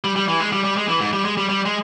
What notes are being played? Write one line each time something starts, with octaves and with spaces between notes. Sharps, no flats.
G3
G3
E3
G#3
G3
G3
G#3
E3
G#2
G3
G#3
G3
G3
G#3